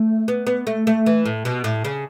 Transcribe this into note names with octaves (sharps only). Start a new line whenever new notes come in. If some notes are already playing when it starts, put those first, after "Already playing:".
Already playing: A3
B3
B3
A3
A3
E3
A2
B2
A2
C#3